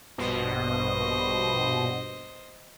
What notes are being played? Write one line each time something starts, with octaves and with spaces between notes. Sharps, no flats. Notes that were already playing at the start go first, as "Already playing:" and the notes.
A#1 G2 B2 C5 D#5